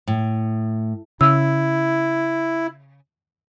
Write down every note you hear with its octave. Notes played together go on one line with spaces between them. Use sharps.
A2
C#3 E4 E6